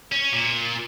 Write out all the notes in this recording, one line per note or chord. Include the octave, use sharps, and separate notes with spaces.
C#4
A#2